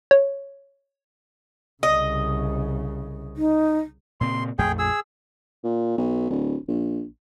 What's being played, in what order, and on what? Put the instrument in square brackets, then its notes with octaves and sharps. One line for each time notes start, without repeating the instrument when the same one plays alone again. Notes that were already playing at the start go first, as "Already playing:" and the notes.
[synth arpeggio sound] C#5
[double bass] C2 C#3 [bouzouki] D#5
[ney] D#4
[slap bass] A#2 C#3 C4 [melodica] C6
[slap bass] A#1 F2 A3 [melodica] G#4 G5
[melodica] G#4 E6
[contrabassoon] A#2
B1
D1
A#1